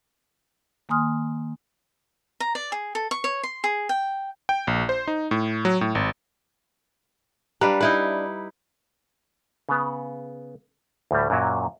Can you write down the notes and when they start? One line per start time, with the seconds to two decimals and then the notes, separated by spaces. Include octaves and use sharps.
0.89 D#3 A#3 G#5 C6 D#6 F6
2.40 A#5
2.55 D5
2.72 G#4
2.95 A4
3.11 C#6
3.24 C#5
3.43 C6
3.64 G#4
3.89 G5
4.49 G5
4.67 A#1
4.89 C5
5.07 D#4
5.31 A2
5.65 F#3
5.81 A2
5.95 G#1
7.61 G3 D4 B4 F5 A#5
7.81 D#4 E4 B4
9.69 C#3 B3
11.11 D2 A2 G3
11.30 F#2 A#2 F#3